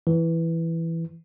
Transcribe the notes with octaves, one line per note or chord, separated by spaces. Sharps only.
E3